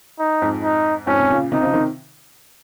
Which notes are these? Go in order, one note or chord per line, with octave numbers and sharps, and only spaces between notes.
D#4
F2 G#2
D#4
F2 G#2 C#4
C3
A#2 C#3
C3 D#3 D#4
C#3 F3
C3 D#3